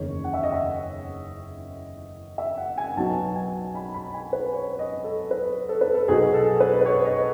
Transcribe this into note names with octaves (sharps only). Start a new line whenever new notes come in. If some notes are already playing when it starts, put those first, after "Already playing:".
Already playing: F#1 E2 D#3 C#5
F#5
E5
D#5
E5
E5
F#5
G#5
B1 B2 F#3 B3 A5
G#5
B5
B5
G#5
B4
C#5
D#5
A4
B4
A4
B4
A4
B1 B2 F#3 G#4
A4
B4
B4
C#5
D#5